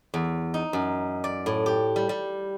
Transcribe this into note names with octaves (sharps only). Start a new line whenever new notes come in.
E2
D#4
F#2
D5
A2
G4
G3
G3